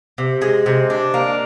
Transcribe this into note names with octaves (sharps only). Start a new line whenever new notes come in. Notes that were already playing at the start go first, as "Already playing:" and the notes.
C3
G#3
C3
D4
A#3